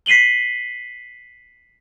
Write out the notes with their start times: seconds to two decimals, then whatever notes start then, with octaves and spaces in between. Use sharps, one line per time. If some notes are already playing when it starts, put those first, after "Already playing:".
0.06 B6 C7 D#7 F#7 G7